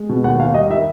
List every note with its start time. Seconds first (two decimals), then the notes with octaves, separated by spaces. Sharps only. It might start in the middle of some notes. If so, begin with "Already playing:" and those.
Already playing: G#3
0.09 B2
0.24 D#2 F#5
0.39 D#2 F5
0.54 G3 D#5
0.70 D#3 E5